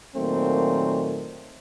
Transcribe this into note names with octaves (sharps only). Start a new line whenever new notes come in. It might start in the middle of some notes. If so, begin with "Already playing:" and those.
A#2 D#3 F#3 A3 A#3 C4